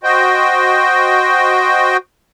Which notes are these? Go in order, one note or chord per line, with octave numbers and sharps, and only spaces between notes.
F#4 C5 D#5 G5